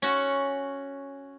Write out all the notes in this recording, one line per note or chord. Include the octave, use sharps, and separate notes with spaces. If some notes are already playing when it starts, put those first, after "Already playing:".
C#4 F#4